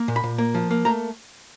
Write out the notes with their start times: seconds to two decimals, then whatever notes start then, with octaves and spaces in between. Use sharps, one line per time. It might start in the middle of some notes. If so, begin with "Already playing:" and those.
Already playing: A#3
0.08 A#2
0.16 B5
0.24 A#2
0.38 A#3
0.54 F3
0.71 A#3
0.85 A3 A#5